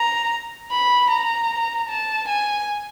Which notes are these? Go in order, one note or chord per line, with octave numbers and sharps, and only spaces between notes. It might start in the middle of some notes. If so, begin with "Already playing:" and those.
Already playing: A#5
B5
A#5
A5
G#5